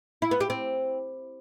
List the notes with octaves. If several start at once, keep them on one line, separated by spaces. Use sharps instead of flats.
E4
B3
G4
C4